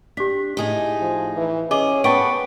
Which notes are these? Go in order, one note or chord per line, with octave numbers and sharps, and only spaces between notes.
D4 G4 B6
A2 D#4 G#4 G#5
F3
E3
C#4 G#4 D#5 D6 G7
B3 D5 G5 A5 C#6 D7